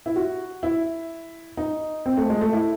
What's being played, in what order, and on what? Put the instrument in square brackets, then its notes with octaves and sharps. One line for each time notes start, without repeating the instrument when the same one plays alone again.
[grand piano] E4
F#4
E4
D#4
C4
A3
G#3
A3
E4